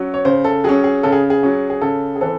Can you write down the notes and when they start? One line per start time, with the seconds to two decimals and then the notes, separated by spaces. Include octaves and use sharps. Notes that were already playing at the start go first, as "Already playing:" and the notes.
Already playing: F#3 C#4
0.14 C#5
0.25 C#3 C5
0.44 A4
0.64 F#3 C#4 G#4
0.84 G#4
1.03 C#3 A4
1.12 G#4
1.30 G#4
1.43 F#3 C#4
1.70 G#4
1.81 C#3 A4
2.16 G#4
2.21 E3 C4 A4